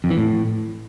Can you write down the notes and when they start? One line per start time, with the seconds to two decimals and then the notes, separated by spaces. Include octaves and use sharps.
0.04 F2
0.10 E3
0.17 A2